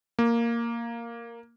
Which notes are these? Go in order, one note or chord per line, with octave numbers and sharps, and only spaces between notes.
A#3